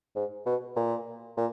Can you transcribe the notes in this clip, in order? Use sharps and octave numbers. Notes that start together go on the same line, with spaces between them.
G#2
B2
A#2
A#2